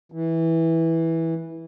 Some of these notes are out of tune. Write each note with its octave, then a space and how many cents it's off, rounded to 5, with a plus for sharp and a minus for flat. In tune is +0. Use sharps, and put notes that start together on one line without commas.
E3 -10